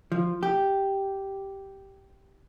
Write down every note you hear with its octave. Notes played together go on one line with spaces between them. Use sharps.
F3
G4